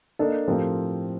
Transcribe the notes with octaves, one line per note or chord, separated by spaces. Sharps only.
A#3 D4 A4 D#5
A2 F3 C4 G4 A#4